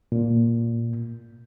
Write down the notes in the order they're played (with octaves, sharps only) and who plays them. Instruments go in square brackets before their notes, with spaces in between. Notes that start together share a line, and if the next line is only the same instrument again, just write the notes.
[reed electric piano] A#2